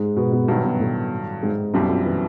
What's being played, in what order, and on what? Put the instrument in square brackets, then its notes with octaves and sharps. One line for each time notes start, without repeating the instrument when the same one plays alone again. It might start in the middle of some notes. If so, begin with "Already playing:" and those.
Already playing: [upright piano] G#2 G#3
B2 B3
B2 B3
[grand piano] G2 D#3 F#3 [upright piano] B2 B3
[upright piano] B2 B3
A2 A3
G#2 G#3
[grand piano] B1 B2 G3 C4 E4 [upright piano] F#2 F#3
[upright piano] F2 F3
E3